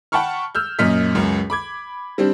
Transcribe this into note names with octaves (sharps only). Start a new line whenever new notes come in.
F#5 G5 A5 B5 C#6 F6
E6 F6 G6
F#2 A#2 D#5 F6 B6
C#2 F#2
B5 D6 G#6
G3 C4 D4 G4